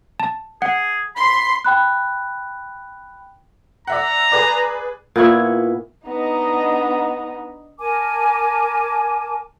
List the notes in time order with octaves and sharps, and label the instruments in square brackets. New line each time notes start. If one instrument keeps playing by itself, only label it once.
[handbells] A5
[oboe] G#4 [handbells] F#5
[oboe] B5 [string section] C6
[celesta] G5 B5 F#6
[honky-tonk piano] D5 E5 F#5 [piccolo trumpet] A#5
[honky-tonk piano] G#4 B4 D5
[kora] A#2 B3 E4 C#5
[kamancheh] B3 D#4 [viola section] D4 D#5 A#5
[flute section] A#4 G#5 A5 D6